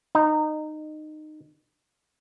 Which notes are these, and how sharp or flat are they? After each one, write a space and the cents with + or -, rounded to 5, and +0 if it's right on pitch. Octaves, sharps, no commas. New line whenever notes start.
D#4 -20